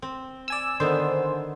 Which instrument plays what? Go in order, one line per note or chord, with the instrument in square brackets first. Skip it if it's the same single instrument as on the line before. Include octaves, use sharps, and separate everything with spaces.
[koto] C4
[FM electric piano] D5 G#5 E6
[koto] D3 D#3 B3 [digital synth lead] C5